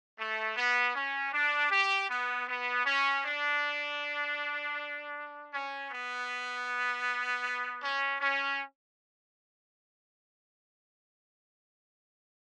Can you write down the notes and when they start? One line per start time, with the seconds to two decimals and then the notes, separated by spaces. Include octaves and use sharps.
0.19 A3
0.56 B3
0.95 C#4
1.32 D4
1.70 G4
2.09 B3
2.48 B3
2.85 C#4
3.24 D4
5.53 C#4
5.91 B3
7.82 C#4
8.21 C#4